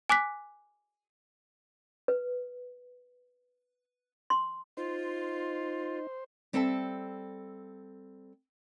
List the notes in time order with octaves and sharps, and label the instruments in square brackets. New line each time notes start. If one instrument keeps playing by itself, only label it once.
[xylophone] G#5 D6 F#6 B6
[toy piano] B4
C6
[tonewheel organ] D#4 [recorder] F4 [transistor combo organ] C5
[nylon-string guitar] G3 C4 A4 E5 G5 A5